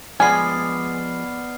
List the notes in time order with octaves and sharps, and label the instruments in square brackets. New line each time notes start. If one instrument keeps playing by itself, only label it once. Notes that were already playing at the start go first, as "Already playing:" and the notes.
[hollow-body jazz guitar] F3 G#3 [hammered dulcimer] B3 D5 [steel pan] G#5 [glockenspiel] F6 C7